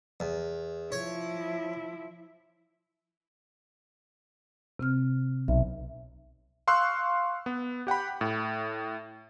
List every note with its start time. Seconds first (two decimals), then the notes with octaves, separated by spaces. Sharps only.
0.20 E2
0.92 F3 E4 C#5
4.79 C3 C4 F6
5.48 B1 E5
6.67 F5 C6 C#6 E6 F#6
7.46 B3
7.87 G4 F#5 G5 B5
8.21 A2